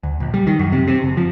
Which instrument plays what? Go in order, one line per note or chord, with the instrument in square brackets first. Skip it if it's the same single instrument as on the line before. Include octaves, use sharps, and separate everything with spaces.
[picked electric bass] D2
A#1
G3
D#3
F#2
C3
C3
F#1
F3